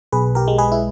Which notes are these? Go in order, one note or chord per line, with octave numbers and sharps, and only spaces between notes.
B1 G#4 B4
G4 A#4
G#3
G#4 B4
E4